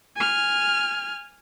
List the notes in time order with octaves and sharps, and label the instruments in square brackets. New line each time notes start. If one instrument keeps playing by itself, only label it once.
[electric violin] G#5 F6